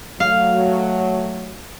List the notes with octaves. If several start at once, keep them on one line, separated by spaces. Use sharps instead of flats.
F#3 A3 F5